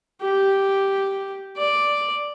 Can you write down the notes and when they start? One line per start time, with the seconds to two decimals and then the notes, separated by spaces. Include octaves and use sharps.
0.21 G4
1.57 D5